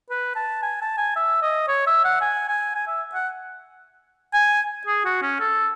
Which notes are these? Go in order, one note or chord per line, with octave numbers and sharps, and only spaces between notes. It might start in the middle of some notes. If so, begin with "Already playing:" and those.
B4
A5
G#5
A5
G#5
E5
D#5
C#5
E5
F#5
G#5
G#5
G#5
E5
F#5
G#5
G#4
F#4
C#4
A4